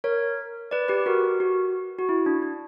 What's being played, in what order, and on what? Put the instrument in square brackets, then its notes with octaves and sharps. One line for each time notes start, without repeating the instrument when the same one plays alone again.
[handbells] A#4 C#5
B4 D5
G4 B4
F#4 A#4
F#4
F#4
E4
D4
D4